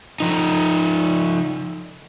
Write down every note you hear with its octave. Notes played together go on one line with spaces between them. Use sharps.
F3 D#4